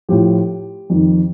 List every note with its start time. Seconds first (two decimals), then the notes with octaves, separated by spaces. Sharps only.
0.09 A2 F3 G4
0.90 F2 D#3